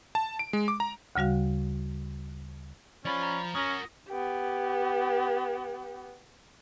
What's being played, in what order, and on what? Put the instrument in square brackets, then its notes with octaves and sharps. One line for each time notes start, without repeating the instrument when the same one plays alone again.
[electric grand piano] A5
D7
G#3
D6
A#5
[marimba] D2 C#3 G3 F#4 F5
[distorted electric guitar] F3 F4 [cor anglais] C#4 [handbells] D5 B5
[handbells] A#5
[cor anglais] C#4 [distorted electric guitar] F#4 A#4 [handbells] D#6 A#6
[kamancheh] B3 G4